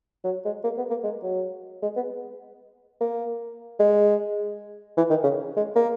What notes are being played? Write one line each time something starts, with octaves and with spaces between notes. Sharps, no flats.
F#3
G#3
A#3
B3
A#3
G#3
F#3
G#3
B3
A#3
G#3
E3
D#3
C#3
G#3
A#3